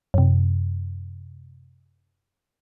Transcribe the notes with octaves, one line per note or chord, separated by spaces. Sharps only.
F#2 C3